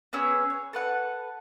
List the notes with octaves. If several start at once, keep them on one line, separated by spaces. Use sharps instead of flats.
B3 C#4 G#4 E6
C#5
A4 B4 F#5